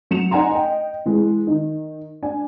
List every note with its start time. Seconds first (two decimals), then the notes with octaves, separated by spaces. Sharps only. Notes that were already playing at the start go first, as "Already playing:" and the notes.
0.11 F#3 C#7 E7 F7
0.31 D#4 D5 F#5 G#5 A#5 C6
0.51 D#5 G5
1.06 E3 G#3
1.47 D#3 D#4
2.22 D4 G#5